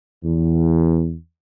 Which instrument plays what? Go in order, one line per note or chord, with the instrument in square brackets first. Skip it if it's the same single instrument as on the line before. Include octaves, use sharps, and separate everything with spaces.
[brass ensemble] E2